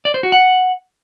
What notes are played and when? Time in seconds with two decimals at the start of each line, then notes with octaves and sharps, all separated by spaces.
0.05 D5
0.14 C5
0.23 F#4
0.32 F#5